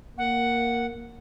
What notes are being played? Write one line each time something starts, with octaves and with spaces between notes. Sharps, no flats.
A#3 F#5